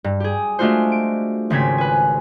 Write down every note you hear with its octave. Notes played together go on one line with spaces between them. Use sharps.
G2
G4 G#4
G#3 A3 D4 F4 F#4 C5
D7
G#1 C#3 C4 C#4 G#6 B6
B4 G#5